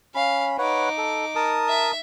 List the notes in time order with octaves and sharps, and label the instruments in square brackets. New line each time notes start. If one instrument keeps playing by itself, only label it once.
[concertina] C#4 B5 [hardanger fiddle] F5
[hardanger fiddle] D#4 D6 [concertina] B4 C#5 F#5
[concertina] A4
A#4 A5 D#6
[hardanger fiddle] E5